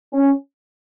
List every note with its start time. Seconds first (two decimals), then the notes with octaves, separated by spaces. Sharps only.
0.13 C#4